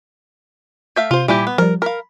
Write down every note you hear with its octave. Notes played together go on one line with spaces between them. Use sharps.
A3 E5 F5 G6
C3 F4 C5
A#2 E3 G3 E4 G4
B3
F3 G3 A#4
A#4 F5 B5 B6